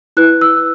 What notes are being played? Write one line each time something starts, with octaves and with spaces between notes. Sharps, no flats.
E4 B4 F#6
E6